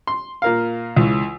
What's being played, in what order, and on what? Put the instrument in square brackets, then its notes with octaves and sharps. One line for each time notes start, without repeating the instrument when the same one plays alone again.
[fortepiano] C6
A#2 A#4 F5
C#2 E3